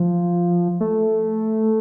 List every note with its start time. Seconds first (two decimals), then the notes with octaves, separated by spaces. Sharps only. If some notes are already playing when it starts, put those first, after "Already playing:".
Already playing: F3
0.80 A3